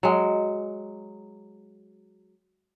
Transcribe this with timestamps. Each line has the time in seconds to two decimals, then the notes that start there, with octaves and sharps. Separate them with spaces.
0.03 F#3 G#3